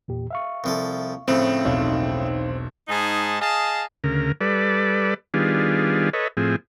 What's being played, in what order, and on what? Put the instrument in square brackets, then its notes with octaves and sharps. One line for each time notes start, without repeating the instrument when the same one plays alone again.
[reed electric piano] E2 A#2 G4
E5 F5 C#6
[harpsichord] C2 F3 A4
[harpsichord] A2 C#3 F3 [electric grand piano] C4
[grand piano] E1 B1 [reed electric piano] D#4 C#5 F5
[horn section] G#2 D#4 G#4 A5
G#4 D#5 F5 A5
[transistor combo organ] D2 C#3 A#4
G3 A4 B4 D5
D#3 G3 B3 D4 F4 G#4
A4 B4 C#5 D#5
A2 F3 C4 G#4